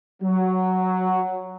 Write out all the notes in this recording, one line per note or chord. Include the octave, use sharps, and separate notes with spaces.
F#3